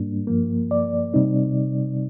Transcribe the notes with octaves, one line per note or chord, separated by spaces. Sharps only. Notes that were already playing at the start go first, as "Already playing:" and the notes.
Already playing: G#2 G3 A#3 D4
G2 F3 A#3
D5
C3 G3 C4 D#4